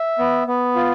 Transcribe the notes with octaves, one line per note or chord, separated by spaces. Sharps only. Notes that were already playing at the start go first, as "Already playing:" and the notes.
Already playing: E5
B3
B3
F4